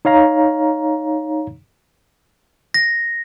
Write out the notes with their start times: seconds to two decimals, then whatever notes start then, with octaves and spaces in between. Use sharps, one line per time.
0.05 D#4 C#5 F5 A#5
2.74 A#6